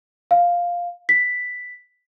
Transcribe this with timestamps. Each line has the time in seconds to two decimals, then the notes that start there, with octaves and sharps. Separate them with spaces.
0.31 F5
1.09 B6